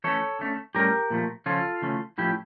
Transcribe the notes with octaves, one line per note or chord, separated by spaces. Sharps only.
E3 A3 C#4 A4 C#5
D3 A3 C#4
A2 G3 C#4 G4 A#4
A#2 F3 A3
C#3 F3 C#4 F4 A4
C#3 E3 A3 C#4
A2 F3 C#4 E4 G4